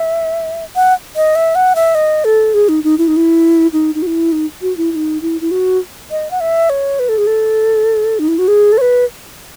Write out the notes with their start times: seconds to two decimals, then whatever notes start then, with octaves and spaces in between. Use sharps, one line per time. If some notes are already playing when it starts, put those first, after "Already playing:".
Already playing: E5
0.76 F#5
1.16 D#5
1.35 E5
1.55 F#5
1.75 E5
1.95 D#5
2.25 A4
2.54 G#4
2.69 D#4
2.84 D#4
2.98 E4
3.08 D#4
3.16 E4
3.73 D#4
3.95 D#4
4.02 F#4
4.07 E4
4.32 D#4
4.62 F#4
4.77 E4
4.91 E4
4.96 D#4
5.22 E4
5.41 E4
5.51 F#4
6.11 D#5
6.31 F#5
6.40 E5
6.70 C#5
6.99 B4
7.09 A4
7.18 G#4
7.27 A4
8.19 D#4
8.28 E4
8.38 F#4
8.48 G#4
8.72 A4
8.78 C#5
8.81 B4